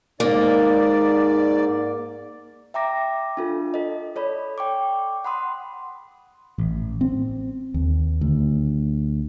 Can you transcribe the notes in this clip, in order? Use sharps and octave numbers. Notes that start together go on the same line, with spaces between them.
G#2 A#3 D5
E5 G5 A#5 D6 A#6
D4 F4 A4
A4 D#5
A4 C#5 D5 B5
G5 C#6 D6
F#5 B5 C6 D#6
A1
C4
D#2
D2